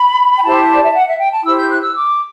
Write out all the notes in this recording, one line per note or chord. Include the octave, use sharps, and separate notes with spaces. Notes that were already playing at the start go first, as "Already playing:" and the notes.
Already playing: B5
G5
E4 G4 C5 A5
D5
E5
F#5
E5
G5
A5
E4 G4 C5 E6
G6
F#6
E6
D6